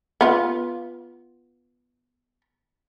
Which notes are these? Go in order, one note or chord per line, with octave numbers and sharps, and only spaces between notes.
B3 F4